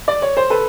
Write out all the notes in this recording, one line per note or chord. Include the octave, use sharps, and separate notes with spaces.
D5
C#5
C5
A4 B4